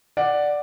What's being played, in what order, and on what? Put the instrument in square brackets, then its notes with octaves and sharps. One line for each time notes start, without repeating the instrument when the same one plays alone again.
[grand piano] D5 F#5